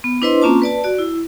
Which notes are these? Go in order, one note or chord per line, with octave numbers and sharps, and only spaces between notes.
B3
D4 E4 B4 C5 D#5 C6
A#3 C4 C#4 F4 A5 D6
B4 D5 A5
F#4 D5
E4